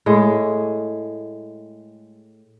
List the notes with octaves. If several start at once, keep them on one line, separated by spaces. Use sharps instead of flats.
A2 G#3